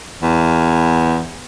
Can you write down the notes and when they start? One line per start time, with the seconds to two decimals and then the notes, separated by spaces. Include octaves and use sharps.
0.22 E2